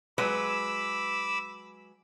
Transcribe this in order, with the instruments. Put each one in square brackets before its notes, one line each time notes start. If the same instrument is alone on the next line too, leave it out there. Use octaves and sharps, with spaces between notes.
[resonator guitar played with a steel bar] F#3 G#3 B4 [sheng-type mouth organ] B5 D6 E6